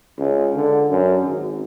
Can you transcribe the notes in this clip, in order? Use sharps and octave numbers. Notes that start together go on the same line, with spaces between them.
C#2
D3
F#2
G#1